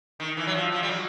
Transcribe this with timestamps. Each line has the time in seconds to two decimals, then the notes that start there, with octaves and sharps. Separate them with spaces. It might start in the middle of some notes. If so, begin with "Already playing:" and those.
0.20 D#3
0.37 E3
0.47 F#3
0.55 F3
0.72 F3
0.83 G3
0.89 F#3